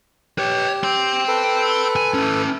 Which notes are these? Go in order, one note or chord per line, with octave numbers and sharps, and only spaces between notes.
G4 B4 C#5
G5 C6
A4 B4
G#5
C#4 E4